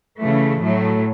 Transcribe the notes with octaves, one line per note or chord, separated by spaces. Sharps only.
C#3 E3 A3
A2 F#3 A3